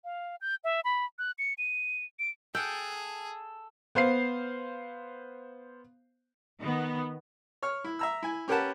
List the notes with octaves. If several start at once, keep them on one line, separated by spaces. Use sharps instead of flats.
F5
G6
E5
B5
F#6
C#7
D#7
D7
G#4 A4 F#5 G5
B3 C5 F5 C7
D#3 B3
C#5 F6
E4
E5 A#5 E6
E4 G#5
C#4 G4 A#4 B4 F#5 A5